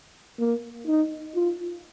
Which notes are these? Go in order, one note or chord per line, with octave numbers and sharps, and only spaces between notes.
A#3
D#4
F4